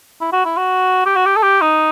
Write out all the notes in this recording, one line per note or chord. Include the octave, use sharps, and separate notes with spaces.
E4
F#4
E4
F#4
G4
F#4
G4
A4
G4
D#4